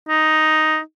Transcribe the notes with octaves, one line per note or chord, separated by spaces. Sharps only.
D#4